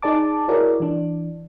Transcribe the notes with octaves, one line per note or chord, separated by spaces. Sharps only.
D#4 G#4 D5 A5 D6
E4 F#4 G#4 A#4 C#5 D5
E3 D4